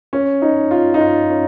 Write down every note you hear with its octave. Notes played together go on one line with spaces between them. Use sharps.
C#4
D#4
F4
D#4
F4
C#4